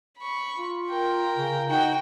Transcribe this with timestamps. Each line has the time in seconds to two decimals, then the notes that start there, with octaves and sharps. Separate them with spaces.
0.18 B5 C#6
0.58 F4
0.90 A#4 G5
1.37 C#3
1.69 D#4 F#4 G5